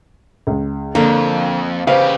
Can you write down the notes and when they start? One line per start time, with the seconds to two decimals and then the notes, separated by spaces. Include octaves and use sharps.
0.47 C#2
0.95 F2 D3 A#3
1.87 C#3 G4 B4 C5 F5